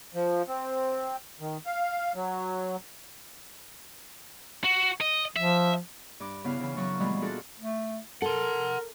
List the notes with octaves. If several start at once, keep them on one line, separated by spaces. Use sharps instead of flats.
F3
C4
D#3
F5
F#3
F#4
D#5
F3 E5
G2 D6
C#3 B3 E4 F5
C#3 E3
F#2 C#3 F#3 B3 C#6
A#2 E3 G3 G#3 B3
D4 F4 F#4 G#4 A4
A3
A4 A#4 F#5 C6